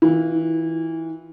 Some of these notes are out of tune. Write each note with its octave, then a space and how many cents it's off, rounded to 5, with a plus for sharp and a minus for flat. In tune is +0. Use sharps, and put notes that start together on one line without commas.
E3 -20 F4 +0